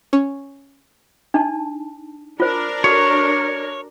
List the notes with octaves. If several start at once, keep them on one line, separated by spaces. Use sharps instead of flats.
C#4
D4 D#4 A5
D4 F4 A#4 C5
F#4 A4 C#5